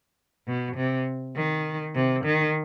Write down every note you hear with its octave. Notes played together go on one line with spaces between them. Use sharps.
B2
C3
D#3
C3
D#3